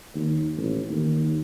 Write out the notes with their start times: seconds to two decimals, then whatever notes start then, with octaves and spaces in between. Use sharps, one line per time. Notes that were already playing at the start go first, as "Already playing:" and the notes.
0.15 D#2
0.57 A1
0.90 D#2